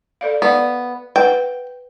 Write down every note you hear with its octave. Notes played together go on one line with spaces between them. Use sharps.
A4 D5 F5
B3 C5 D5 F5
B4 F#5 G5